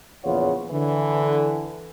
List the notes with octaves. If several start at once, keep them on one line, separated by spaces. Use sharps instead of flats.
A#1 E2 C#3 F4 C#5 F#5
D3 E3